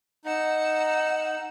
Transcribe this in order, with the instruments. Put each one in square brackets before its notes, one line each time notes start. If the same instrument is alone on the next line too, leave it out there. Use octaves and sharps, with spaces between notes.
[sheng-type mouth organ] D#4 [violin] F#5 E6